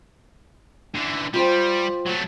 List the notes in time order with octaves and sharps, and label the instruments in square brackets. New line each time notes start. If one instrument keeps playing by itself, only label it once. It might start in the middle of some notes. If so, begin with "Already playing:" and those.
[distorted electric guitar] D3 E3
[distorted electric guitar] G3 [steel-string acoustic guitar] F4 C5 G5
[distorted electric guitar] F#3 A3